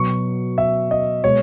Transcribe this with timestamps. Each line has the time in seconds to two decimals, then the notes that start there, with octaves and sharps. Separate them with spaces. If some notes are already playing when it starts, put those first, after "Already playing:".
Already playing: B2 F#3 C#6
0.58 E5
0.91 D#5
1.23 B2 G#3 C#5